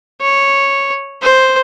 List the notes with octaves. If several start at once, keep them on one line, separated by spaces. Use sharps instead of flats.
C#5
C5